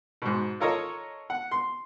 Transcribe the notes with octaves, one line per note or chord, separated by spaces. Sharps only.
G#2 B2
F4 A4 A#4 C#5 D#5
F#5
C6